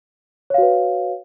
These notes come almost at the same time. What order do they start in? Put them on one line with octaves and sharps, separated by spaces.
C#5 F5 F#4 B4